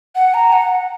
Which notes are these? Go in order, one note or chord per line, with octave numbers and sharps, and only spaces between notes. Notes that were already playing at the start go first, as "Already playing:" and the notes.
F#5
A#5
F#5